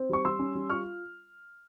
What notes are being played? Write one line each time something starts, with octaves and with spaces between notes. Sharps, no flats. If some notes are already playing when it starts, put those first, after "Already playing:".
Already playing: C4
G3 C#6
G3 C6 E6
C#4
G3
F4 C#6 F6